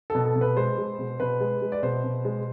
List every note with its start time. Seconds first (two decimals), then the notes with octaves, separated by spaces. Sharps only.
0.10 B2 A4
0.25 A4
0.36 B2
0.41 B4
0.56 G#3 C5
0.78 G#3
0.99 B2
1.20 B2 B4
1.41 G#3
1.62 G#3
1.72 D5
1.83 B2 C5
2.04 B2
2.25 G#3